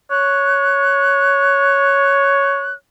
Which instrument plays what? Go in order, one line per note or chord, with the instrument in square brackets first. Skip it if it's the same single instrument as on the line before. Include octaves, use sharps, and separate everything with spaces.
[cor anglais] C#5 [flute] F#6